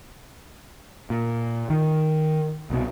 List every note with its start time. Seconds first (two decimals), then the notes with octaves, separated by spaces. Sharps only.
1.10 A#2
1.70 D#3
2.70 C2 B2